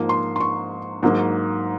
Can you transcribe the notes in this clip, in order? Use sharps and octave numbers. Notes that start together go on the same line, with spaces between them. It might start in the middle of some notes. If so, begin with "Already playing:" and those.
Already playing: G#2 F3 A#3
C6
C6
C#6
G#2 F#3 A#3